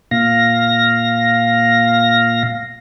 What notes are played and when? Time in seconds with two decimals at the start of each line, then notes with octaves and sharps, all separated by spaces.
0.11 A#2 F5 A#6